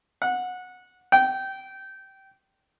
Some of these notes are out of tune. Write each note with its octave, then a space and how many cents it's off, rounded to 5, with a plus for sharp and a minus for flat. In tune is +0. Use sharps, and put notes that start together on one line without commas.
F#5 -20
G5 -20